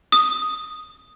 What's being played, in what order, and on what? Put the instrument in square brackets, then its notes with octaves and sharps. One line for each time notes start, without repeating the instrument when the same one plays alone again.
[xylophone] D#6